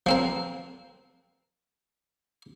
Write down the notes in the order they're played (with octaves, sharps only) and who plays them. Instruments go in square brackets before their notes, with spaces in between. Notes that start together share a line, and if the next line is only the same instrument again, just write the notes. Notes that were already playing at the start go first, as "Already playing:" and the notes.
[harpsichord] F3 C4 A#4